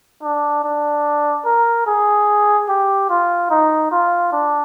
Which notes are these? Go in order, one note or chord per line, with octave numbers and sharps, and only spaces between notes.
D4
D4
A#4
G#4
G4
F4
D#4
F4
D4